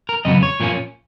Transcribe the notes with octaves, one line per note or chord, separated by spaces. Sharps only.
A#4
F2 C#3 F#3 B3 D#5
C#5
A#2 F3 A#3 C#4